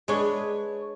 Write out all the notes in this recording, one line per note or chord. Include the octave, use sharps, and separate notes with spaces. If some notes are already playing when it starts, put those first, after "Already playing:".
G#3 D4 B4 C#5